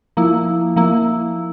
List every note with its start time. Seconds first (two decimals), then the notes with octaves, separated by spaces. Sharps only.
0.17 F3 A#3 E4
0.76 F3 A#3 E4